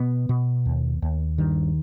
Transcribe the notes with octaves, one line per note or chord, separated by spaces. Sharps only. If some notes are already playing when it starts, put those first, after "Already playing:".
Already playing: B2 B3
B2
D#2
D#2
G2 D#3